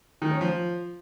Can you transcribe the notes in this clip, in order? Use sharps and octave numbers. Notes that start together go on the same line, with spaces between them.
D#3
C#4
F3